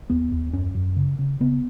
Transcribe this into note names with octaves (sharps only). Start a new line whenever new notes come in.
D#2 B3
D#2
F#2 C#4
F#2
C#3
C#3
C#3 B3